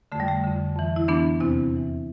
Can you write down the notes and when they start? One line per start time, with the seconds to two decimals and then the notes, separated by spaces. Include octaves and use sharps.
0.12 D3 A3
0.15 F2 G3
0.28 A3
0.44 F2 D3
0.76 F2 E3
0.96 E4
1.08 F2 E3 B3 D4
1.40 E2 C3 E3 C4 E4
1.73 E2 C3 E3